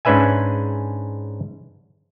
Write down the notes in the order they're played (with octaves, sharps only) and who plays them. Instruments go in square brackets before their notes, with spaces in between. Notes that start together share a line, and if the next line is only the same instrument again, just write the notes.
[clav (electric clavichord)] G#2 C#4 D4 B4 E5 G#5